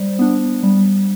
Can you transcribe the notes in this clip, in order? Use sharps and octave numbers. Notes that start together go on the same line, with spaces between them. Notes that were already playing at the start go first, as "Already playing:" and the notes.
Already playing: G3 C5 D5
B3 D4
G3